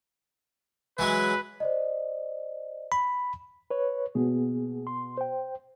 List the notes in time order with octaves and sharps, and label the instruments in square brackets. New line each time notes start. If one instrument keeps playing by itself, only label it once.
[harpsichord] E3 F#3 G#3 [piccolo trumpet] B4
[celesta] C5 D5 D#5
[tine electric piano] B5
[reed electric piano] B4 C#5
[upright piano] B2 [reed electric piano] A#3 B3 G#4
[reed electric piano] C6
C5 G5